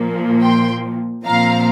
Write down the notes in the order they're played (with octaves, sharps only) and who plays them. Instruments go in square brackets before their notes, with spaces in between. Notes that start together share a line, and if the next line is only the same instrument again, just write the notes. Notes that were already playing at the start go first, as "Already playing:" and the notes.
Already playing: [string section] A#2 F3 A#3
G5 C6
A#2 F3 C4 F5 A#5